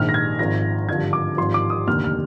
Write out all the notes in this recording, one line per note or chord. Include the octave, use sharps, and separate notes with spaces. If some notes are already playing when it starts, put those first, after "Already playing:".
Already playing: A#1 G#2 D#3 F6
A#6
G#6
G#1 G#2 F3 A#6
G#1 G2 D3 F3 G#6
D6
G#1 G2 F3 C6
D6
D#6
F1 D#2 D3 F6
F6